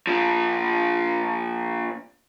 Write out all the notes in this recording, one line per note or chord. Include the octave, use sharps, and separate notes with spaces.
A#2 F3